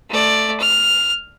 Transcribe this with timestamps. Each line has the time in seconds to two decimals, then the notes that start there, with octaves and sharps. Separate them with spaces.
0.10 A3 D5
0.60 F6